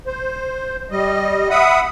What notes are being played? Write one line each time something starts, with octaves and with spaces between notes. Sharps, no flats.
C5
G3 D#5
E5 F#5 B5 D#6